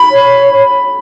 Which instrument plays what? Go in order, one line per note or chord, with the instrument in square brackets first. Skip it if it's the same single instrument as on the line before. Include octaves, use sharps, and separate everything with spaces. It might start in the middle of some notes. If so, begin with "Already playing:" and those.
Already playing: [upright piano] B5
[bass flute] C#5